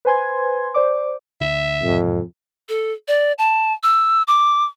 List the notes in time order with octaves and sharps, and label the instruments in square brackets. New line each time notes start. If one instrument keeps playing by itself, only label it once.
[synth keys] B4 C5 G#5 C6 G#6
C5 D5 D6
[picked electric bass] D2 D3 [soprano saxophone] E5
[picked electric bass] E1 G#2 C3 [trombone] F2
[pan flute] A4
D5
A5
E6
D6